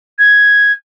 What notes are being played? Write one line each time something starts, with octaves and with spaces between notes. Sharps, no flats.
G#6